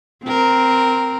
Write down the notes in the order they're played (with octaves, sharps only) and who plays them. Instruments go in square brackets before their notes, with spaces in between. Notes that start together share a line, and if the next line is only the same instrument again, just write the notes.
[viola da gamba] C4 A#4